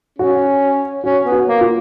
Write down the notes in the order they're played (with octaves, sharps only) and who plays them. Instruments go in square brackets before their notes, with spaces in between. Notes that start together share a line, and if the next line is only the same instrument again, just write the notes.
[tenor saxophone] C#4 [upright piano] F#4
[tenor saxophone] C#4 [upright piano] F#4
[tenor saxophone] B3
[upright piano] F#4
[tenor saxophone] A#3
[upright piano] F4